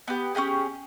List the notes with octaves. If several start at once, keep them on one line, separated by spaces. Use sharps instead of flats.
B3 G4
C#4 F4 G4 G#4